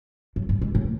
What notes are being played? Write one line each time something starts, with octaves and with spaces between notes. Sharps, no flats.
F#2
G2
G#2
A2